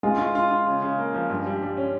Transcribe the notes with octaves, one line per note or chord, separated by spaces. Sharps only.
G#3 F4
F4
F4
F4
C#3
C#3
A#3
F3
G2
G3
G3
C#4